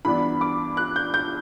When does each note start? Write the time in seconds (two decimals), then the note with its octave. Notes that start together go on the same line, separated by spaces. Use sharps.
0.05 G2 E3 B3 D4 B5
0.41 D6
0.77 F#6
0.96 G6
1.14 G6